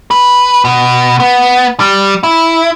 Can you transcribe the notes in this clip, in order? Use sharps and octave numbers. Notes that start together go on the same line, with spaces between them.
B4
B2
B3
G3
E4